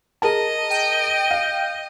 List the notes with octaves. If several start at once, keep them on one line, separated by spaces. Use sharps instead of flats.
G#4 A#4 D#5 A5
G5
F5